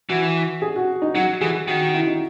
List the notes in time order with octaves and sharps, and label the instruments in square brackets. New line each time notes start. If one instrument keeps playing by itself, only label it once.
[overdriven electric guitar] E3 [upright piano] F#4
[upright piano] G#4
F#4
D#4
[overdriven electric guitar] F#3 [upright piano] F#4
[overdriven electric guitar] E3 [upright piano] G#4
[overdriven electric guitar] D#3 [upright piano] F#4
[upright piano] F#4
E4
D#4